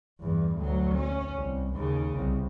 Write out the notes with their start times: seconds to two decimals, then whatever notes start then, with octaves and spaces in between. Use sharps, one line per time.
0.20 E2 G2
0.57 D2 F#3
0.95 C#4
1.34 C2
1.74 D#2 C#3
2.14 C2